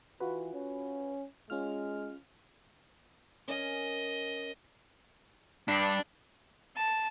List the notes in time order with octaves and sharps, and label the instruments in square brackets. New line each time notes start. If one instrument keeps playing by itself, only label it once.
[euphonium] E3 [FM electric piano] F4 F#4 B4
[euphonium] C#4
[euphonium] G#3 [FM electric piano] C#4 F4 F6
[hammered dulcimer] C#4 A#4 G#5 [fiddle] D#5
[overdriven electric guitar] G2 [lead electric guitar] D4
[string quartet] A5